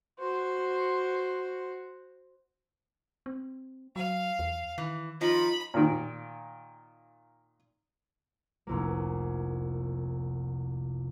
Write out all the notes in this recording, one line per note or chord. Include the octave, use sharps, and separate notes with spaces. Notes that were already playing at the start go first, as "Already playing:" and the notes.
F#4 C5
C4
F#3 F5
E2
D#3 E3
F3 D#4 F4 B5
A#2 D#3
F1 C2 A#3